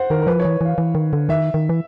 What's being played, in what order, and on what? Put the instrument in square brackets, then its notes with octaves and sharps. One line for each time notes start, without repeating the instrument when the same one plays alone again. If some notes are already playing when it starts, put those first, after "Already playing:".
Already playing: [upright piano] C5 F#5
[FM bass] D#3 [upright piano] A#4
[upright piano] A#4
[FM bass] F3 [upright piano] B4
[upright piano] C#5
[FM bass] E3
[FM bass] E3 [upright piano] F5
[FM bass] E3
D#3
D3
[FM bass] D#3 [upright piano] E5
[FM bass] D#3
E3